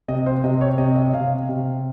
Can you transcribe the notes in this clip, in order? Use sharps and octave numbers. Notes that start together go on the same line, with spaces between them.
C3 D#5
C5
C3 D#5
C#5
C3 D#5
D#5
C3 F5
C3